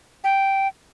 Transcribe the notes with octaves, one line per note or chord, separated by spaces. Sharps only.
G5